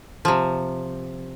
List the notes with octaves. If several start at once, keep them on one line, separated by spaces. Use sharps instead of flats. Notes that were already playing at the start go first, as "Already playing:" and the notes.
C3 F3